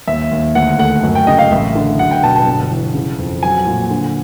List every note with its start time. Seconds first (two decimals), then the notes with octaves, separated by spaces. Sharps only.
0.07 D#2 E5
0.31 D#2
0.55 D2 F#5
0.79 A3 F#5
1.03 F#2
1.15 G5
1.27 C#3 D#5
1.39 F5
1.51 A1 E5
1.75 D3
1.99 F#3 F#5
2.11 G5
2.23 B2 A5
2.35 A5
2.47 G1
2.71 E3
2.95 C#3
3.19 F2
3.43 F#3 G#5
3.67 A#2
3.91 D3